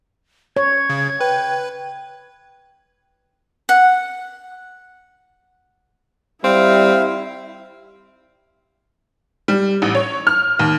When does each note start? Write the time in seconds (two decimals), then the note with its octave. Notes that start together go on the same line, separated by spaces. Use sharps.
0.56 C#5 G#6
0.89 C#3
1.21 B4 G5
3.69 F#5
6.44 G3 C4 E4 F5
9.48 G3
9.82 A1
9.95 C#5
10.27 F6
10.59 D#2